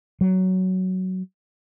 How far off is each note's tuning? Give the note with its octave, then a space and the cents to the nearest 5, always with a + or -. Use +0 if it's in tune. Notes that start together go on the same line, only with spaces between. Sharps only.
F#3 +10